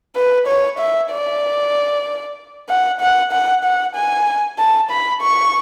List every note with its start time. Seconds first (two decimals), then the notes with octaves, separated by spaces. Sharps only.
0.16 B4
0.47 C#5
0.79 E5
1.11 D5
2.69 F#5
3.01 F#5
3.32 F#5
3.64 F#5
3.95 G#5
4.58 A5
4.91 B5
5.22 C#6